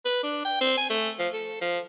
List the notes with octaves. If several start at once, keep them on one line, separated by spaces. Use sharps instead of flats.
B4
D4
G5
C4
G#5
A3
F3
A4
F3